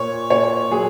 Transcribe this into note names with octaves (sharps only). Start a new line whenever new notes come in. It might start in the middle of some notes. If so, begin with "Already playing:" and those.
Already playing: A#2 C#5
A#2 C#5
F#3 G#4